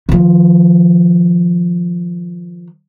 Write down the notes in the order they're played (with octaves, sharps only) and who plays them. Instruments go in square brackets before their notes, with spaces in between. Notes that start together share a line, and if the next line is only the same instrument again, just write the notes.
[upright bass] D#3 F3